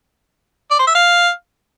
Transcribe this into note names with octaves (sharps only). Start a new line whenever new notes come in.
D5
C5
E5
F5